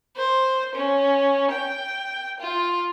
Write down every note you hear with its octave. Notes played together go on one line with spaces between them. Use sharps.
C5
C#4
G5
F4